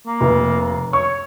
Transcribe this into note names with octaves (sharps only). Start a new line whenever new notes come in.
A#3
F1
C#5 C#6